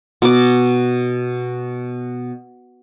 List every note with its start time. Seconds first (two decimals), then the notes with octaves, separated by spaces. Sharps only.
0.22 B2 D6